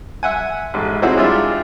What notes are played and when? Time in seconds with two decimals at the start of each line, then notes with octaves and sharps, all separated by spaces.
0.23 E5 F#5 G#5
0.74 A1 G#2
1.02 C4 D#4 E4 F#4 G#4 C#5
1.17 G#3 D4 D#4 F4 G4 E5